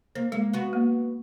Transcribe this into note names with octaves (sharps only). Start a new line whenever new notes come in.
A#3 C5
G#3 A#3
B3 F#4
A#3